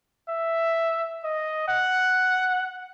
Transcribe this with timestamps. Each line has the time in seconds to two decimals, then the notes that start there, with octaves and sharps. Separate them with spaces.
0.29 E5
1.24 D#5
1.68 F#5